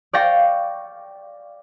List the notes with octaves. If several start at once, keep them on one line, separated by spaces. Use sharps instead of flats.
D5 F5 G5 C#6 A6 A#6